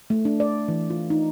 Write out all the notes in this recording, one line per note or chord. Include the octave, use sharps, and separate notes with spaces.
A3
D4
D5
E3
F4
D#4